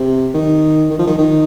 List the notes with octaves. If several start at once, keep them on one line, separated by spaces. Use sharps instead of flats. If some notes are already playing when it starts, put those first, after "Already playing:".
Already playing: C3
D#3
D#3
F3
D#3
D#3